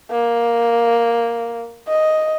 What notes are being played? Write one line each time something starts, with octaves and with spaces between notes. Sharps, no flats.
A#3
D#5